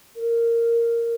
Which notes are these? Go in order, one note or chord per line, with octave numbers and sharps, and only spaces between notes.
A#4